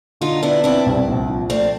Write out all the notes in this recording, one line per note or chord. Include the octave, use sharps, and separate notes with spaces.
D3 D#4 F4
B3 D4 E4
C4 D4 E4
C2
A#1
F3
A3 C4 D4